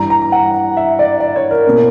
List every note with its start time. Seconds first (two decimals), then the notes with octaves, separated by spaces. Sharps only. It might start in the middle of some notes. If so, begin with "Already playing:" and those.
Already playing: G2 E3 G3 A#5
0.10 A#5
0.32 F#5
0.77 E5
0.99 D5
1.20 D5
1.36 C#5
1.51 A#4
1.65 B2 A#3 E4